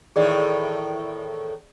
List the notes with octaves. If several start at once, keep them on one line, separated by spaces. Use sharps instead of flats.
E2 A2 D#3 G#4 D5